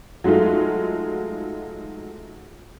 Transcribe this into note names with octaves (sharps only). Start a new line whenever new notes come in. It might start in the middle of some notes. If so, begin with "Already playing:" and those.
F#3 G#3 A3 D#4 F4